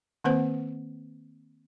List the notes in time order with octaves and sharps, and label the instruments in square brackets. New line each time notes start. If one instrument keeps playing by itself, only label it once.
[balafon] D#3 A#3 C4 B4 C5 F#5